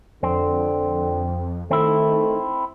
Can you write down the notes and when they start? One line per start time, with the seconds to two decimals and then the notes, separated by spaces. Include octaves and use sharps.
0.23 F2 D3 C4
1.71 D#3 A3 C4 E4